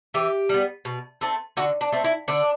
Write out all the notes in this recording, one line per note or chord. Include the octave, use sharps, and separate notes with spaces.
E3 G4
G3 B3
B2
A3 C4
D3 F#4
D4
A3 C4
E4
D3 D4